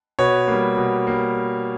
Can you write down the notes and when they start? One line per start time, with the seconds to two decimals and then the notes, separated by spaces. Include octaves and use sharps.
0.19 B2 B4 C#5
0.48 G3 A#3
0.77 B2
1.07 G3 A#3